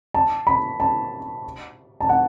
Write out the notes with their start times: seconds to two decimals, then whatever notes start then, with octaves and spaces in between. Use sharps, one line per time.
0.14 A5
0.47 B5
0.80 A5
2.00 A5
2.09 F#5